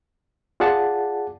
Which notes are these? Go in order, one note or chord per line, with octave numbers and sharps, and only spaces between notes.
F4 G#4 D5 F#5 A5